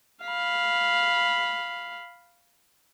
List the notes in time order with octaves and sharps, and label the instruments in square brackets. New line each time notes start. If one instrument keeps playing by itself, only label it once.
[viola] F5 B5